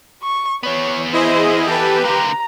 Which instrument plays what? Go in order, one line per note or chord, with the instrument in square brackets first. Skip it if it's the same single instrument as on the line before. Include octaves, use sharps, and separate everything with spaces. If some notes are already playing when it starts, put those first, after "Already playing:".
[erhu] C#6
[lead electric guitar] E2 B3 [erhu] C#5
[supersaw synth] E4 G#4 D#5 [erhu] C5
[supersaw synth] G4 B4 [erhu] A4
[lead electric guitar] D3 A#3 [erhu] A#5